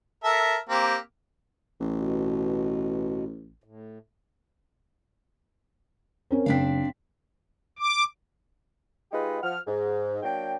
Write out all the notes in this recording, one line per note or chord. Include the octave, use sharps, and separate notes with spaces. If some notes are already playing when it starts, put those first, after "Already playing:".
A4 A#4 E5
A#3 C4 G4
A1
B2
A2
C4 C#4 A#4
F#1 C4 D4 F5 B6
D6
G#3 D#4 F4 G4 G#4 B4
F3 F#5 F6
G#2
F#3 A#3 D4 G5